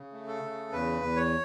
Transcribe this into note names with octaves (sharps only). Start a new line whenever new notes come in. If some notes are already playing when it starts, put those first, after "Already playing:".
Already playing: C#3
A3
A4
C#3
E2 B4
E2
C#5